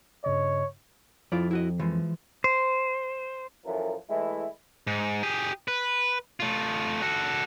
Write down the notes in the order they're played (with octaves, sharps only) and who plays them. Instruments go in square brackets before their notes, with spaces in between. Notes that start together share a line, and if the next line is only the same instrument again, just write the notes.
[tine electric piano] G2 C#3 D#5 [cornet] C#5
[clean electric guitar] F2 [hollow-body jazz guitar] E4 F4 D5
[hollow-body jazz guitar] E4 F#4 D#5
E3 F3 G#3
[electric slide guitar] C5
[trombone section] F#2 E3 F3 A4 A#4
E3 G#3 A3 E4
[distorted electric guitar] G#2
G4 G#4
B4
A3 F4
F#4 A4